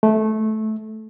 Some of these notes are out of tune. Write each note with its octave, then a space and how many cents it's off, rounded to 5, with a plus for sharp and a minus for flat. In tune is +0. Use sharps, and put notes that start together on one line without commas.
A3 -15